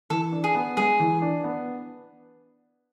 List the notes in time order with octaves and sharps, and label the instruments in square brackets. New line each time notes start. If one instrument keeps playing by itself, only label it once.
[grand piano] E3 [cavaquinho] A4
[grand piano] D4
[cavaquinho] G#4
[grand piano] B3
[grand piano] G#3 [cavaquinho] G#4
[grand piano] E3
D4
B3